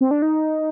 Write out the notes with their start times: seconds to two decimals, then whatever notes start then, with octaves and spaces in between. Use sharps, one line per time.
0.01 C4
0.11 D4
0.22 D#4